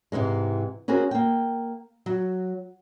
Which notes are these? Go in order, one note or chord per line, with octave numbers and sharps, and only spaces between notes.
G#2 C3 E3 G#3
C#4 F#4 G#4 A#4 C5
A#3 G5
F#3